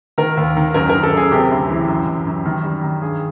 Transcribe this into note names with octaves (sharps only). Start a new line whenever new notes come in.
D#3 A#4
D#2
D#3
F#2 A#4
A#4
F#2
A4
F#2 G#4
C3 G4
D2
E3
F#2
F#2
F#2
D#3
G3
D#3
G2 G#4